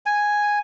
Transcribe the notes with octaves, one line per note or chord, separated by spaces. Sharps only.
G#5